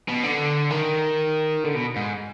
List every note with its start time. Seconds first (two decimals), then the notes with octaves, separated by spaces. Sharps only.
0.08 B2
0.23 D3
0.71 D#3
1.64 D3
1.74 B2
1.96 G#2